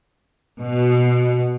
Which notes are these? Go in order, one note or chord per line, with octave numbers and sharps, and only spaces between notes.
B2